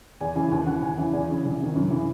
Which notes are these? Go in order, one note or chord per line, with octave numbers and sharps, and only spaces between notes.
E2 G#5
C#3 E3 G#5
D#2 G#5
C#3 E3 F#5
D#2 G#5
C#3 E3 G#5
E2 G#5
C#3 E3
C2
C3 D#3
F#2
C#3 E3